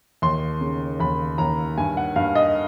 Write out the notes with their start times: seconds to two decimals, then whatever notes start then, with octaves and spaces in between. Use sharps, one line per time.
0.22 D#2 C6
0.61 C#3
1.00 D#2 B5
1.38 D#2 A#5
1.78 G2 G#5
1.97 F#5
2.16 G2 F5
2.35 D#5